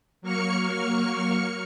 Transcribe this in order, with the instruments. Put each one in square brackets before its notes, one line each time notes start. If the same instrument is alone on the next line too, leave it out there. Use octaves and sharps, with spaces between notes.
[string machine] F#3 A#3 C#6 F6 C#7